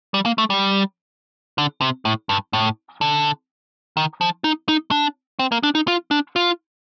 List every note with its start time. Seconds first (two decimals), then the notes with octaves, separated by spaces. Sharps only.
0.14 G3
0.25 A#3
0.38 A3
0.50 G3
1.58 D3
1.81 C3
2.05 A2
2.29 G2
2.53 A2
3.01 D3
3.97 D#3
4.21 F3
4.44 D#4
4.69 D#4
4.91 D4
5.39 C4
5.52 A#3
5.63 D4
5.75 D#4
5.88 F4
6.11 D4
6.36 F4